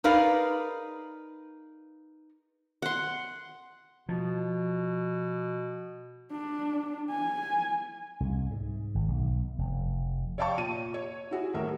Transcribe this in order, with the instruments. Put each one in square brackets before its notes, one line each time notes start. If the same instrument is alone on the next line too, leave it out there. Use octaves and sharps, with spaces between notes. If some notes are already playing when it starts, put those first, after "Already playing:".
[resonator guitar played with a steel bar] D#4 G#4 A#4 B4 D5 F5
[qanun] F#5 C6
[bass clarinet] B2 [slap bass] F3
[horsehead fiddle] D4
G#5
[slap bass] C2
G#2
G#1
B1
F1
[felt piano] C#5 D5 F5 G5 A5 C#6
A#2 D#7
C#5
E4 F#4 G#4
D#1 A2 A#4 E5